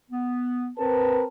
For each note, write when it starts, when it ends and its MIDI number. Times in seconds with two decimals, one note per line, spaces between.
0.11 0.71 59
0.78 1.23 60
0.78 1.23 70
0.78 1.23 71
0.78 1.27 81